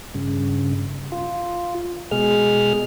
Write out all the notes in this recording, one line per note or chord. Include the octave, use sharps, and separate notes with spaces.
G2 C#3
F4
B2 G#3 G#4 F6